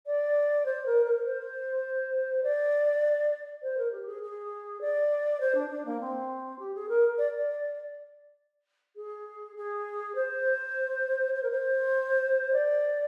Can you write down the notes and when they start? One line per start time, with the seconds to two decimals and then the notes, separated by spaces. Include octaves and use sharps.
0.06 D5
0.65 C5
0.86 A#4
1.05 A#4
1.25 C5
2.43 D5
3.62 C5
3.77 A#4
3.92 G4
4.06 G#4
4.22 G#4
4.81 D5
5.40 C5
5.54 D4
5.70 D4
5.85 A#3
6.00 C4
6.59 G4
6.74 G#4
6.88 A#4
7.18 D5
7.38 D5
8.96 G#4
9.56 G#4
10.15 C5
11.34 C5
11.43 A#4
11.50 C5
12.52 D5